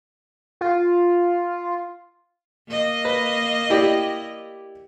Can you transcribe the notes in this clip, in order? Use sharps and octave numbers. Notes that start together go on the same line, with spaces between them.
F4
A#3 D#5
B4
E4 G4 D5